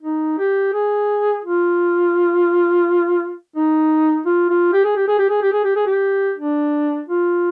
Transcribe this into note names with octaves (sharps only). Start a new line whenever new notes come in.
D#4
G4
G#4
F4
D#4
F4
F4
G4
G#4
G4
G#4
G4
G#4
G4
G#4
G4
G#4
G4
D4
F4